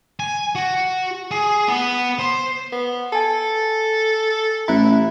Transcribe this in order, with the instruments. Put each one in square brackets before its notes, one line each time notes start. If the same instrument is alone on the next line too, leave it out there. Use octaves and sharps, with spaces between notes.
[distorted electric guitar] G#5
F#4
G#4
B3
C5
[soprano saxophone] B3
[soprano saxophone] A4 [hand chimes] G#5 A5
[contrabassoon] A1 [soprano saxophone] E4 [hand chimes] A#5 F#6